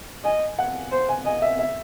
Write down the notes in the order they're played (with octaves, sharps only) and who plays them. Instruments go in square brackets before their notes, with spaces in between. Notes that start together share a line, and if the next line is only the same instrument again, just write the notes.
[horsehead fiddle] D#5 [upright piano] G#5
[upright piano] F#5
[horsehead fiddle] C5
[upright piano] G#5
[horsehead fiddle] D#5 [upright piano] G#5
[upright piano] E5
E5